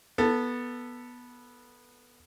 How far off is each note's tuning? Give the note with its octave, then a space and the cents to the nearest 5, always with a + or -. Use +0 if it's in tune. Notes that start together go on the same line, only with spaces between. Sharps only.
B3 -10 A4 +5